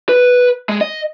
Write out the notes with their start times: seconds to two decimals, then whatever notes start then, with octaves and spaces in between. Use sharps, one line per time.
0.09 B4
0.69 G#3
0.81 D#5